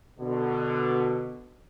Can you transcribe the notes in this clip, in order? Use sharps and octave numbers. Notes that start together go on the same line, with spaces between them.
B2 D3